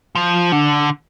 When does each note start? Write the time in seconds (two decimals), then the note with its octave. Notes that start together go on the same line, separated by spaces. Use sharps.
0.15 F3
0.52 D3